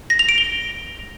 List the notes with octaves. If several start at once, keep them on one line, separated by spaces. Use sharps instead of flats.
A#6
F7
D7
G7